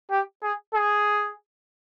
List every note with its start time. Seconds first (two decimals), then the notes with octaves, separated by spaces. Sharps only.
0.11 G4
0.43 G#4
0.74 G#4